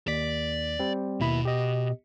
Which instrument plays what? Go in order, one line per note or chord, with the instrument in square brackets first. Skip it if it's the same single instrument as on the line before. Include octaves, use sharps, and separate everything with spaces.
[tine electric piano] D#2 B6 [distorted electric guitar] D5
[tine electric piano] G3 C4
[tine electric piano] D#2 E4 B5 [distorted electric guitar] B2
[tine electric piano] G4 D#5